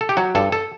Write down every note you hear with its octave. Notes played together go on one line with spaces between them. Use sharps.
A4
G4
F#3 F#4
G2 A4
A4